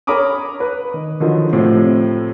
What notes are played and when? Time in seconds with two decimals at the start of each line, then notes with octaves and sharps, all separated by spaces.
0.07 A#4 C#5 A#5 B5 D6 D#6
0.60 B4
0.94 D#3
1.20 D3 D#3 F3 F#3
1.53 A2 C3 F3 C4